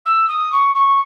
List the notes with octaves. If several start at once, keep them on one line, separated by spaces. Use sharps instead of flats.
E6
D#6
C#6
C#6